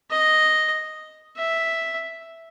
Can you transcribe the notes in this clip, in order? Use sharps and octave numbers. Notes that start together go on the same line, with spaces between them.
D#5
E5